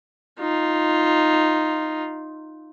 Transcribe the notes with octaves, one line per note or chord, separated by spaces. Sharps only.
D#4 F4